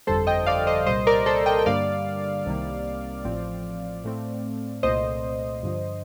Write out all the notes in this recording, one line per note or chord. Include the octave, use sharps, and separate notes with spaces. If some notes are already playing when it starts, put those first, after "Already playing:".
G1 F2 D3 G3 A4 C5
D#5 G5
D5 F5
C5 D#5
C2 A#2 G3 C5 D#5
A#4 D5
A4 C5
D#5 G5
G5
G2 D3 G3 A#3 D5 F5
C2 C3 D#3 G3 A#3
A1 A2 F3 C4
A2 A3 C4
C2 A#2 A3 C4 C5 D#5
G2 D3 F3